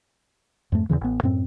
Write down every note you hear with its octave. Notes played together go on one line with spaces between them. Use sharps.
F2 G#2 A3
E2 G2 C#3 E3
A1 B3
F#2 A2 C4